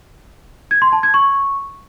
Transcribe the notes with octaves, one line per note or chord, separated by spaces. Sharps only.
G#6
C6
A5
G#6
C#6